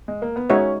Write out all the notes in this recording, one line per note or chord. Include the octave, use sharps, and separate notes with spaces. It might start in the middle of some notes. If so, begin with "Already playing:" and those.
G#3
A#3
B3
G#3 C#4 D#4 F#4 C#5 E5